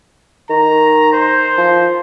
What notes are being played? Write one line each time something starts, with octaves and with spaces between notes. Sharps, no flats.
D#3 A#5
C5
F3